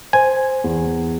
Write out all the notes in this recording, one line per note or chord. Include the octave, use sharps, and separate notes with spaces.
C5 G#5
E2